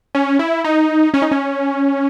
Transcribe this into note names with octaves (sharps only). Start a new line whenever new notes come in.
C#4
E4
D#4
C#4
D#4
C#4